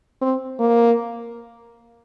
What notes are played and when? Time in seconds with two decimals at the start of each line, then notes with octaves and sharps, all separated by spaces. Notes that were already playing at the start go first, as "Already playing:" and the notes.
0.22 C4
0.60 A#3